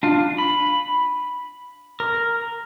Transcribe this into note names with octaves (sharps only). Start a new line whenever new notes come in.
D4 F4
B5
A#4